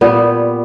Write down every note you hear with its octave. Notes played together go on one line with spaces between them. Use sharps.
A#2 G3 B3